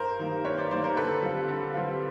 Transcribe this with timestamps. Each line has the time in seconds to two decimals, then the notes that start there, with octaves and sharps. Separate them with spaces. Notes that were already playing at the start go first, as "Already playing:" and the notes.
Already playing: G2 A#4 C5
0.19 D#3 G3 A#3
0.44 G2 B4 C#5
0.57 C5 D5
0.71 D#3 G3 A#3 C5 D5
0.84 A#4 C5
0.97 D3 A4 B4
1.22 G3 C4 F4
1.48 D3
1.74 G3 C4 F4